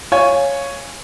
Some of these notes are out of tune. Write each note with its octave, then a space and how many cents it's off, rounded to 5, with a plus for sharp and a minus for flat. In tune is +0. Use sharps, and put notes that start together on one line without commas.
C#5 +0 F5 +0 G#5 +0